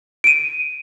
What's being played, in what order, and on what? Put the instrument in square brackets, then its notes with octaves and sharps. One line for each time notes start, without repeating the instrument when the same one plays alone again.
[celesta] D7 D#7